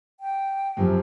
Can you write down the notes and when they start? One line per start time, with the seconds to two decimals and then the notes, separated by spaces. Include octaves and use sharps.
0.20 G5
0.77 F#2 C3 F3